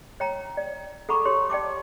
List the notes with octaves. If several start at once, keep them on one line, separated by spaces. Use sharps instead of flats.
C#5 G5 A#5
D5
A4 F#5 A#5 B5 C#6 D6
G4 C#5 C6
D5 G5 A5 D6